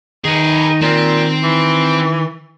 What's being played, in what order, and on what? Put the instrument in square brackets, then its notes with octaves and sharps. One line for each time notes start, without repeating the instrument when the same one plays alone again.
[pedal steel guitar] D#3 [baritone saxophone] D#4 [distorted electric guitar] G#4 B4
[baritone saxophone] A#2 [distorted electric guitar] C4
[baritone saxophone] E3